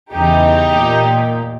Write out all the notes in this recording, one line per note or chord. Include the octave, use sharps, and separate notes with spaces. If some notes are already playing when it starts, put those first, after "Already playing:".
E2 C#3 E3 D#4 G4
A#2